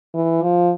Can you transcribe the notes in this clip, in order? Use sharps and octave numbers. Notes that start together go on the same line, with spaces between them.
E3
F3